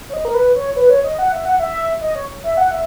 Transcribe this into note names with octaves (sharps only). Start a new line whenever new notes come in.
C#5
D#5
A#4
B4
C#5
B4
C#5
D#5
F#5
E5
F#5
E5
D#5
C#5
E5
F#5
E5